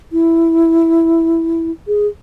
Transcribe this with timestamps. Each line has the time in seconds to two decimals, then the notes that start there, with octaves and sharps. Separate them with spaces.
0.12 E4
1.87 G#4